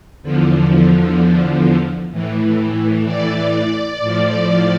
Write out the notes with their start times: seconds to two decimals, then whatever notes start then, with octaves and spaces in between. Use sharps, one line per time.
0.23 E2 D3 F3
2.11 A2 E3
3.06 D5
4.00 A2 F3